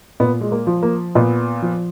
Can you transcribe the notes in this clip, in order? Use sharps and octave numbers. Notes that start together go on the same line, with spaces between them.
A#2 B3
G#3
A#3
F3
A#3
A#2 B3
F3